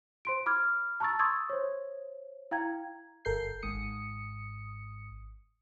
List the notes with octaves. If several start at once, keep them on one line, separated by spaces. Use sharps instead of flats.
C5 C6 D7
B5 D6 F6 G#6
A5 A#5 C#6 E6 A6
C6 C#6 D#6 E6 G#6 A6
C5 C#5
E4 F5 G5 A#5 G#6
G1 A4 A#4 G6 C7
G#1 G#2 D#6 C#7